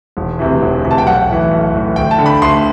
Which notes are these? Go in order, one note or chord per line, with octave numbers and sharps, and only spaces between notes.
E1
D2 C3 E3
E1
D2 C3 E3
A5
G5
B1 F#5
A2 E3
B1
A2 E3
D2 G5
A5
D3
B5
D2 C6